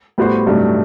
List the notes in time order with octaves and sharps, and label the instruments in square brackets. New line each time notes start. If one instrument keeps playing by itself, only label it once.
[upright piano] A2 [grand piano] G3 B3 F#4 C5
[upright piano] G2 [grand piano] C3 F#3 A3 D#4